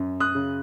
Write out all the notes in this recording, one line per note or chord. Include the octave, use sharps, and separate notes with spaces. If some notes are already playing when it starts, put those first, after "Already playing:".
Already playing: F#2
D#6 F#6
C#3